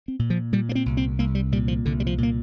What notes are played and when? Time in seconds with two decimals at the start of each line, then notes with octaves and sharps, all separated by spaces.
0.08 C4
0.19 A#2
0.30 F3
0.52 A#2 G3
0.69 A#3
0.75 C4
0.86 C2
0.97 C4
1.19 C2 A#3
1.35 G3
1.52 A#2 G3
1.68 F3
1.85 C2 D3
2.00 G3
2.07 F3
2.18 A#2
2.23 A#3